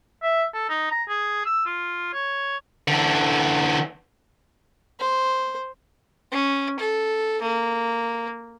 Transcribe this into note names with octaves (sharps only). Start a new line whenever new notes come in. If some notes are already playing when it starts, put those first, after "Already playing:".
E5
A4
D#4
A#5
G#4
E6
F4
C#5
D3 E3
C5
C#4
A4
A#3